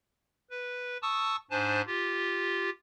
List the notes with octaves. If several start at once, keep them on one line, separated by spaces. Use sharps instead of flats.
B4
A5 C#6 D#6 E6
G#2 D4 C5 G#5 A5
F4 G4